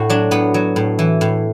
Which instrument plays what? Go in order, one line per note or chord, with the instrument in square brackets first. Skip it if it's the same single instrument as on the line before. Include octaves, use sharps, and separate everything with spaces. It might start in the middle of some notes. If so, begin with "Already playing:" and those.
Already playing: [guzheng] A2 F#4
F#3 D4
A2 B3
F#3
A2
E3
A2